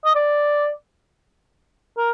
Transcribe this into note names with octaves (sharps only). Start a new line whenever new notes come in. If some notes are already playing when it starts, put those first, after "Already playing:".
D#5
D5
A#4